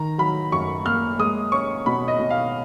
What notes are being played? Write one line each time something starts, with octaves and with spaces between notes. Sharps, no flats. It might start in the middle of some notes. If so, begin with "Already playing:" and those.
Already playing: D#3 A#5
F#3 B5
F#2 C#6
A#3 F6
G#3 D#6
C#4 C#6
B2 B5
D#5
B2
F5